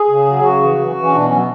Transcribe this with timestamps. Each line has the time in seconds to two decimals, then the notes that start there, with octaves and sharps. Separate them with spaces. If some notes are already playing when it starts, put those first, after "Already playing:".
Already playing: G#4
0.08 C#3
0.26 F#3
0.44 C#3 F#4
0.61 E3
0.79 E3
0.96 E3
1.04 C#4
1.13 B2 D4
1.25 C#4
1.31 F#3
1.36 B3